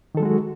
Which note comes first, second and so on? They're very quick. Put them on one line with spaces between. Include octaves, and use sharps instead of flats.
D#3 A4 F#3 G#3 F#4